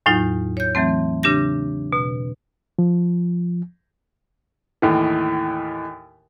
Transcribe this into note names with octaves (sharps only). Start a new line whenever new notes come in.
E2 A2 F#3 D#4 F4
C#5 G6
E3 F#3 A3 C4
C#3 D4 G4 A#6
B2
F3
D#2 A2 E3